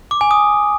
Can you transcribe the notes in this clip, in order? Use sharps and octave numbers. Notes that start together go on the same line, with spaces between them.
D6
G#5
D#6